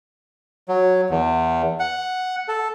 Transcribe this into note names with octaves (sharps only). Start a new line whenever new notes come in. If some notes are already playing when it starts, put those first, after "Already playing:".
F#3
E2
F#5
A4